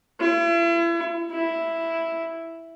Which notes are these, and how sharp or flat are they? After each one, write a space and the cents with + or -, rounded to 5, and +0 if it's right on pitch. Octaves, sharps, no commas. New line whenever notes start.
E4 +40
E4 +0